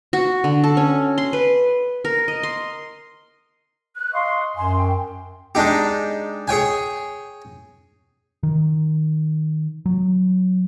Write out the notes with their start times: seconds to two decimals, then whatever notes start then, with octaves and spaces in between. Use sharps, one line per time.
0.13 F#4
0.44 D3
0.64 A4
0.77 C#4
1.18 C6
1.33 B4
2.05 A#4
2.28 D#5
2.43 C6
3.96 F#6
4.14 D#5 F5 C6 C#6
4.57 F#2 G#5 C6
4.76 G5
5.55 G#3 D4 D#4 G4
6.48 G#4 C#5 G5 G#5
8.43 D#3
9.86 F#3